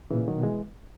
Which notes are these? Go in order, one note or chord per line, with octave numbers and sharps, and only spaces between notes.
A#2 C#3 E3
D#3 F#3
B2
E3 G#3